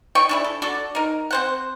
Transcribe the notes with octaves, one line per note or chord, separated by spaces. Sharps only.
C#5 D#5 G5 C#6
D4 E4 G#4
A4
D4 F#4 A4 D5
D#4 A#4
C4 C5 F#5